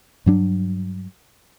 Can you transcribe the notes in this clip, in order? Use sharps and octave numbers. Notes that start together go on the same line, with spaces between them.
G2 F#3 D4